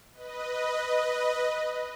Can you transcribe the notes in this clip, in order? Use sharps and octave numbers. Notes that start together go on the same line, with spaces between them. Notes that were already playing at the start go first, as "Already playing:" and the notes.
B4 D#5